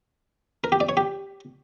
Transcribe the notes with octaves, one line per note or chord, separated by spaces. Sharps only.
A#4
G4
D5
C#5
G4